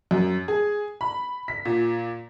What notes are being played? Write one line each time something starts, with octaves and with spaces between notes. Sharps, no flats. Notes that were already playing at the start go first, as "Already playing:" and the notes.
F#2
G#4
B5
B6
A#2